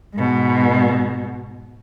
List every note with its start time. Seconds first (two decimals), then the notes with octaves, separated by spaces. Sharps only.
0.14 G#2 B2